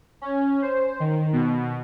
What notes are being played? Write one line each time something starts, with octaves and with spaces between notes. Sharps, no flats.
C#4
C5
D#3
B2